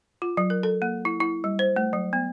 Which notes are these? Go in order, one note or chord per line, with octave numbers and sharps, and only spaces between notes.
F4
F#3
A#4
A4
A#3
E4
E4
G3
C5
A3
F#3
B3